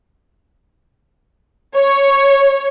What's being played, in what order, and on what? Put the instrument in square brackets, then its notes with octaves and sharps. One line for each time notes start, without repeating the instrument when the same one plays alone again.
[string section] C#5